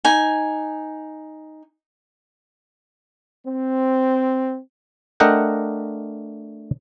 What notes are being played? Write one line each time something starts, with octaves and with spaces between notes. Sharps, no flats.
D#4 G#5
C4
A3 D4 A#4 D#5 F#5 G5